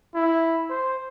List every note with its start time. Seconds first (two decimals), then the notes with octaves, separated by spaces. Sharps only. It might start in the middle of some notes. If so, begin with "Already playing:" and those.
0.15 E4
0.70 C5